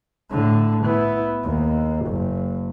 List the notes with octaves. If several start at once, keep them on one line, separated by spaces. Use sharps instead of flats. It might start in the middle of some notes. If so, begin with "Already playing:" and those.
A2 D3
B3 E4
D#2
F#1